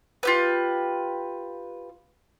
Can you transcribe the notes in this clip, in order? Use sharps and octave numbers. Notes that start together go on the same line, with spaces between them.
F4 G4 B4